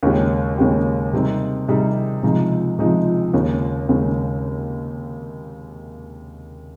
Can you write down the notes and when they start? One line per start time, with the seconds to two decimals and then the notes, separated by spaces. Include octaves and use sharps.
0.03 D#2 C#3 G#3 C#4 G4
0.58 D#2 C#3 G#3 C#4 G4
1.13 C3 G3 C4 D#4 G#4
1.68 C3 G3 C4 D#4 G#4
2.23 C#2 C3 F3 G#3 D#4
2.79 C#2 C3 F3 G#3 D#4
3.33 D#2 C#3 G#3
3.89 D#2 C#3 G#3